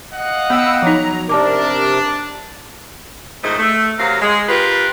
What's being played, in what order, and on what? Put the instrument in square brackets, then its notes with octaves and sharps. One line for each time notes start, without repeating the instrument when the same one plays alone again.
[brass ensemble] D#5 F5 F#5
[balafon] B3 [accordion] G5 B5 E6
[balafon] F3 D#4 [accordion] F#3 A#5
[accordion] C3 A#4 [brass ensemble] D4 [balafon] D5 A5 D6
[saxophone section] F2 G#2 D#3 A3 C5 D#5
A3
F#2 C3 F#3 A#4 F5
G#3
F4 G4 A#4 B4